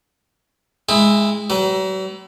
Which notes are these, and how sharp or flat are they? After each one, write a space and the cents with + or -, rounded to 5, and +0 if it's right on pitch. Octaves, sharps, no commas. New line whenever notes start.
G#3 +0 E4 +0 G5 +40
F#3 +45 B4 +30